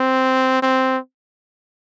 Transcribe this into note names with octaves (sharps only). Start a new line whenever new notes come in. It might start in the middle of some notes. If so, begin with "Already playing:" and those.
Already playing: C4
C4